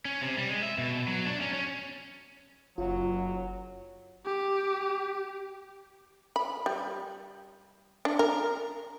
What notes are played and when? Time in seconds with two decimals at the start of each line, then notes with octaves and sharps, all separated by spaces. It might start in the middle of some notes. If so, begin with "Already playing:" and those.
0.05 C#4
0.22 C3
0.37 G3
0.50 G#3
0.63 E5
0.78 B2
1.08 F#3
1.25 D4
1.41 C#4
1.53 C#4
2.78 F#1 F#3 F4
4.25 G4
6.36 B5
6.66 G3
8.05 D4
8.19 A#4